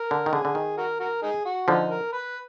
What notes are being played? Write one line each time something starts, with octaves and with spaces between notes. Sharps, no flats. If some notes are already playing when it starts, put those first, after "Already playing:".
Already playing: A#4
D3
D#3
D3 G#4
D3
D#3
F#4 A#4
F#4 A#4
D#4 G#4
F#4
D3 F3 D#4
A#4
B4